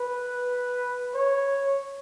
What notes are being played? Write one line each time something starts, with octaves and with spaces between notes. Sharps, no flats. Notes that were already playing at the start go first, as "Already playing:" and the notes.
Already playing: B4
C#5